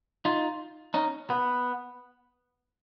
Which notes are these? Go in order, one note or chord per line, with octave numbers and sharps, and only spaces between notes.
D#4 F4
C#4 D#4
B3